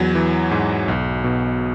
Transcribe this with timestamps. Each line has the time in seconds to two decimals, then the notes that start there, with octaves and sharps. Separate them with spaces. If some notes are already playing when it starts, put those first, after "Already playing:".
Already playing: E2 F#3
0.15 E3
0.51 G#2
0.88 B1
1.24 B2